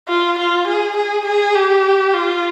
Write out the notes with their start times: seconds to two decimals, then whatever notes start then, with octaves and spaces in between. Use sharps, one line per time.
0.08 F4
0.38 F4
0.68 G#4
0.97 G#4
1.26 G#4
1.55 G4
2.14 F4